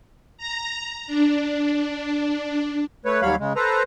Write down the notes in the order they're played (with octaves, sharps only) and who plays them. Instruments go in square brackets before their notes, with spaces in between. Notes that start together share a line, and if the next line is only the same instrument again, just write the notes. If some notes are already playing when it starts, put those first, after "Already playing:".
[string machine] A#5
D4
[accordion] A3 B4 C#5
D#2 F#3 G3 C#5 F5 B5
C#3 G#3
A4 B4 C5 A#5